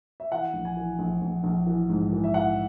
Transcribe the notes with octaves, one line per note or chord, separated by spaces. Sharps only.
E5
E3 F#5
A#1
G#5
E3
A#1
A#1
A#1
E3
G#2
E3
E5
E3 F#5